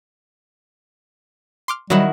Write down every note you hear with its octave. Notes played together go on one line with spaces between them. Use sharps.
C6 D6 F6
D#3 F#3 G3 E4 F#4